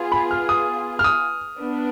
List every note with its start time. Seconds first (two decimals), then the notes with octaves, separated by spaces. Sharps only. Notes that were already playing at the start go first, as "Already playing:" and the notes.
Already playing: B3 F4 G#4
0.12 B5
0.31 F6
0.49 D#6
0.99 F6
1.04 D#6
1.60 B3 D4